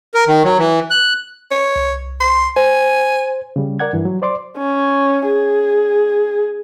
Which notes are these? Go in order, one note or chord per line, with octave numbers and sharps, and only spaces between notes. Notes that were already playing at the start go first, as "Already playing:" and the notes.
A#4
D#3
F#3
E3
F#6
C#5
C2
C6
C5 G#5
C#3 G3
A#4 D5 F#5 G#6
G2 E3
F#3
C5 D5 C6 D6
C#4
G#4